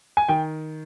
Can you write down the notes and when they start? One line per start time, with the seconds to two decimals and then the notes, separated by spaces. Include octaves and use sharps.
0.17 G#5
0.29 D#3 G5